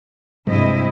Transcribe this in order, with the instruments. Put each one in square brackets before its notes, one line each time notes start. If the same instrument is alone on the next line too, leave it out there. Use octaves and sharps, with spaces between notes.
[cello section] G2 E4 D#5 [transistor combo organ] C3 [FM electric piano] G#3